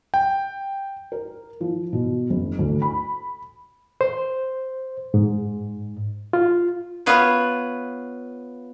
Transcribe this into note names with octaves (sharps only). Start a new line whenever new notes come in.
G5
A#4
F3
B2
F#1
D2
B5
C5
G#2
F4
B3 F4 B4 C#5